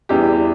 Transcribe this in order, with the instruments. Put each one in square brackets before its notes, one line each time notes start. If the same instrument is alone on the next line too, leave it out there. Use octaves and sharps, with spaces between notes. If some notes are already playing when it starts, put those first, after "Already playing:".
[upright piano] E2 E3 G3 G4